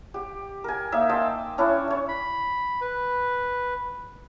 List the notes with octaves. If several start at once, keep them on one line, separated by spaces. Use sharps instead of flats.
G4
A#4 G#5
A#3 D#4 E5
C5 D#5 G5 A5
C#4 D4 E4
C#5 D5
B5
B4